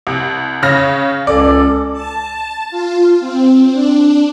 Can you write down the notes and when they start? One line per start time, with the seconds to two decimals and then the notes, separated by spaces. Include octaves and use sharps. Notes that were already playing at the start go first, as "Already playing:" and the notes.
0.07 C2
0.63 C#3 F6 A#6
1.27 C#2 C#4 A4 D5
1.93 A5
2.71 F4
3.20 C4
3.72 D4